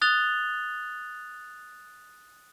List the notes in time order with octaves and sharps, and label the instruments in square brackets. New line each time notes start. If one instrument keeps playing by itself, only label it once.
[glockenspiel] D#6 F#6 A6 F7 G7